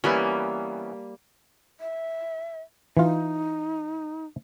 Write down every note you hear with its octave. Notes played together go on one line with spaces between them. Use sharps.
E3 G3 A#3 B3 C#4
E5
E3 D#4 F4